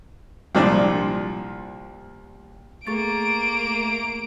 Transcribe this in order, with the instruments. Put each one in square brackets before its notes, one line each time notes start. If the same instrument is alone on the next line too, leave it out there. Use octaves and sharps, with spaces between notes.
[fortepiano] C2 A#2 F3 D4
[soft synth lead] A3 [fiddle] A#3 [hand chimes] G#4 C#6 A6 [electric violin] D7